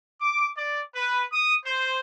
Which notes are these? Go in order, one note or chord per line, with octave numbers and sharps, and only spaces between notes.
D6
D5
B4
D#6
C5